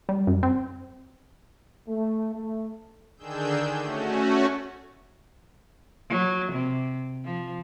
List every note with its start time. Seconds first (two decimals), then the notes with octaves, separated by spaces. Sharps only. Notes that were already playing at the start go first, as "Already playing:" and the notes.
0.09 G3
0.27 F#2
0.43 C4
1.88 A3
2.34 A3
3.17 D3 D#3 D4 G#4 E6 G6
3.78 A3 C#4 F#4
6.10 F#3
6.52 C3
7.25 F3